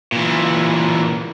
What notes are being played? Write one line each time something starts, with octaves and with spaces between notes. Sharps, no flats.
A#2 E3